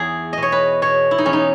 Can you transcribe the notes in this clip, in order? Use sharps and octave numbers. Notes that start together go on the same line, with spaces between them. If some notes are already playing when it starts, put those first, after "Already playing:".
Already playing: E2 G#4
B2 D#5
C#5
B4
B2 C#5
E4
D#4
E2 C#4
D#4